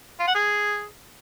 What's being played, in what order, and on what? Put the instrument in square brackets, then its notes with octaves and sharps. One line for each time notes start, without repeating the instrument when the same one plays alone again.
[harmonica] F4
F#5
G#4